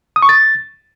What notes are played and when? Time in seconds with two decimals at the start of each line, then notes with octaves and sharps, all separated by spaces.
0.16 D#6
0.22 C#6
0.29 A6